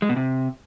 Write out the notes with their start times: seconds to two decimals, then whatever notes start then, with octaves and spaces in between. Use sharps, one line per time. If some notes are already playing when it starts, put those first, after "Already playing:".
0.02 G#3
0.09 B2
0.16 C3